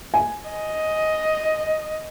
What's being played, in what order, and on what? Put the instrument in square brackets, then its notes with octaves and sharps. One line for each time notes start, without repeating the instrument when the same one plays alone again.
[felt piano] G#5
[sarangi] D#5